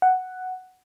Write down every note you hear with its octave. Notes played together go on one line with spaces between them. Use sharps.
F#5